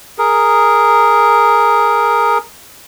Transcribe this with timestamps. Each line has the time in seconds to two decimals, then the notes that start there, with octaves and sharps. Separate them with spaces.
0.18 G#4 A#4